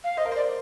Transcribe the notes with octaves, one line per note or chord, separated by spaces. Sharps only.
F5
C5 D#5
A#4
C5 D5